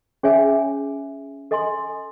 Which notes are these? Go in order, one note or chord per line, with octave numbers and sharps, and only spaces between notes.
C#4 G#4 C#5 E5 G#5
A4 D#5 G#5 C6